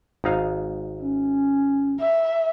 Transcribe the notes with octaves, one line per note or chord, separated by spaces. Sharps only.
G#1 D#4 F5
C#4
E5